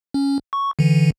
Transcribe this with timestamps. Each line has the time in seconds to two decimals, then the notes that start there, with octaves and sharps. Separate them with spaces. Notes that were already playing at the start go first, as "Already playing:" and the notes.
0.14 C#4
0.53 C#6
0.79 D3 E3